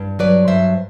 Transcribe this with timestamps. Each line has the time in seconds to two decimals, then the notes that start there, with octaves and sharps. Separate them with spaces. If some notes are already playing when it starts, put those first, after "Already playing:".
Already playing: G2
0.19 F#3 B4 D5
0.48 G2 C5 E5